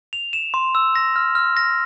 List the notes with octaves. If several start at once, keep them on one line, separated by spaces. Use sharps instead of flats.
F7
E7
C6
E6
A#6
F6
F6
A#6